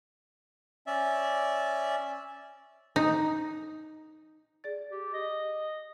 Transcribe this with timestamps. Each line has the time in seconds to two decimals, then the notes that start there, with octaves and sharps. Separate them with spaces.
0.87 C#4 D5 E5
2.96 D#4
4.64 G#4 D5 A6
4.91 G4
5.13 D#5